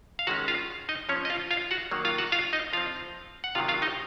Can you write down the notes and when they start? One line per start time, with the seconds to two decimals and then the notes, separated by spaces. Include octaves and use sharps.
0.19 F5
0.27 D#3 G#3 C#4 F#4 F#5
0.48 F4 F5
0.89 D#4 D#5
1.09 F3 C#4 C#5
1.12 C4
1.25 D#5
1.30 F4 F5
1.51 F4 F5
1.71 F#4 F#5
1.91 D#3 F#3 A#3
2.05 F4 F5
2.18 F#4 F#5
2.32 F4 F5
2.53 D#4 D#5
2.73 F3 C4 F4 F5
3.44 F#5
3.55 C3 D#3 F#3 F4 F5
3.68 F4 F5
3.82 D#4 D#5